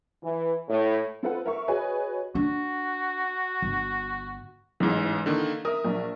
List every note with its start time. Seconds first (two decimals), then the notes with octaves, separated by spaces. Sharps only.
0.22 E3
0.67 A2
1.23 C4 F4 A4 B4 C5 F#5
1.45 A#4 E5 C#6
1.68 F#4 G#4 B4 C#5 D#5 G#5
2.35 D4 F#4
3.62 G1
4.80 A1 G#2 E3
5.26 D3 D#3 A#3
5.65 A#4 E5 D#6
5.84 A#1